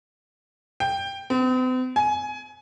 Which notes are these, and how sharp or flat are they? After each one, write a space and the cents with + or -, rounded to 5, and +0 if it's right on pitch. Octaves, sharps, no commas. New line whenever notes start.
G5 +10
C4 -45
G#5 +15